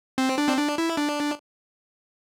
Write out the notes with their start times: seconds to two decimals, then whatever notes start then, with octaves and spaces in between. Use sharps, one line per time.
0.18 C4
0.38 D4
0.48 C4
0.57 D4
0.78 E4
0.97 D4